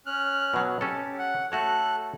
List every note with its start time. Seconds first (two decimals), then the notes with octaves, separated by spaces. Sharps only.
0.06 C#4 F6 F#6
0.54 B2 F#3
0.81 C#4 G4 A4
1.19 F#5
1.52 A3 F#4 A4 C#5 F#6